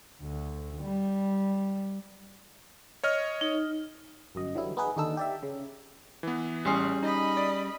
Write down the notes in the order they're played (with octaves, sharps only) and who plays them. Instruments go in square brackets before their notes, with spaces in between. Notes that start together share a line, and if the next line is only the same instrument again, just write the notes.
[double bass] D2
G3
[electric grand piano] C#5 D#5 F6
[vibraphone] D#4
[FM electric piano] G1 F#2 D#5
D3 E3 F#3 G3 E4
B3 D#4 G#4 B4
D#2 D3 D#4 A4 E6
G4 D5 E5
C#3
[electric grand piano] E3 B3
[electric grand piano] A1 C6 C7 [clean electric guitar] G3 C#4 G#4
[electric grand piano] D#4 [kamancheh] D#5 B5
[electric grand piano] D5